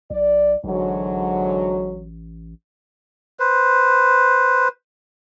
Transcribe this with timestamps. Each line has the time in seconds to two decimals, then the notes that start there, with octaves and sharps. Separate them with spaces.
0.10 B1 D5
0.64 A1 G#2 D3 F#3
3.39 B4 C5